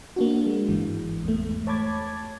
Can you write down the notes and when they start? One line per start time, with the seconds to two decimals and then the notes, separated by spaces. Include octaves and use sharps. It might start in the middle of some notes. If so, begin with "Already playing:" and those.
0.16 A#3 D4 F#4
0.46 G#3
0.68 G1 G#2 E3
1.24 E2 G#2 A3
1.67 C#5 A5 B5 D6 G#6 A6